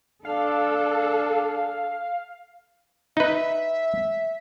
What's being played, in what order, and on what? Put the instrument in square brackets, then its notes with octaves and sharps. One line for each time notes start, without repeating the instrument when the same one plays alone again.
[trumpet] D4 [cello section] A4 [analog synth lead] F5
[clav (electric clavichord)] D#4 B4 [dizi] E5